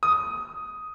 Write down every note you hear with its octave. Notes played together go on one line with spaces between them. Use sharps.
D#6